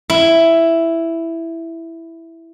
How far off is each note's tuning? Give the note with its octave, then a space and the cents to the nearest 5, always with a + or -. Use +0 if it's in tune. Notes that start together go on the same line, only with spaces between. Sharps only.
E4 +5